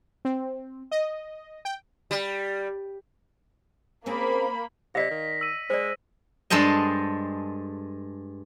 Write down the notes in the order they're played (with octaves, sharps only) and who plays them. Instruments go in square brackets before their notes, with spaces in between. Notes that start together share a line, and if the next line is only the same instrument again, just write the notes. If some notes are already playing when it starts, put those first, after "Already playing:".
[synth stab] C4
D#5
G5
[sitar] G3
[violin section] A#3 B5 [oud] C4 C#4 G#4
[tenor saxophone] C3 [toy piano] D5 D#5 F5 [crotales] A#6 B6
[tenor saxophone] D#3
[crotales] E6 D#7
[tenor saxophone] G#3 [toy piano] C5 D5
[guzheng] G2 G#3 A4 C5 D#5